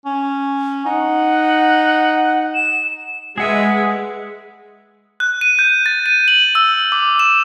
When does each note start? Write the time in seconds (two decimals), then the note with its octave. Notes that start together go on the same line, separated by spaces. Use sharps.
0.05 C#4
0.85 D#4 F#5
2.54 E7
3.38 G#3 G#4 B4 E5 F#5 G#5
5.20 F#6
5.41 D#7
5.59 G6
5.86 A6
6.06 D#7
6.28 F#7
6.55 E6
6.92 D6
7.19 E7